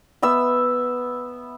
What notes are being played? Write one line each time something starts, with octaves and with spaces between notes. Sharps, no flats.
B3 E5 E6